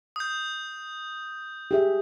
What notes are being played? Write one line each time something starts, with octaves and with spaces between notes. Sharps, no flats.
D#6 G6
G4 G#4 E5